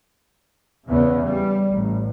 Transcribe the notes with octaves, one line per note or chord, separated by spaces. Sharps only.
E2 C#3 B3
G3
A1